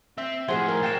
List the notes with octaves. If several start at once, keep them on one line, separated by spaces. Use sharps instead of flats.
C4 E5
A2 F3 F#4 G#4 C5 F#5 G#6 G7
A#4 A#5 G#6
F#3 G#3 F5 G5 A6 C7 E7